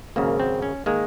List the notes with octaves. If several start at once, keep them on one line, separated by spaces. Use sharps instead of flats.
G#1 F#2 C#3 A#3
C4
C#4
D#3 G#3 A#3